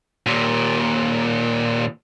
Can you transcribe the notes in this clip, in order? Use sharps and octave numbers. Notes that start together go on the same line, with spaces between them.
D#2 A#2